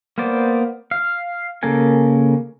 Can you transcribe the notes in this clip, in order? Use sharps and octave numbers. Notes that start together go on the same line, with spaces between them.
A#3 B3 C5 D5
F5
C#3 A#3 A4 A#4 G#5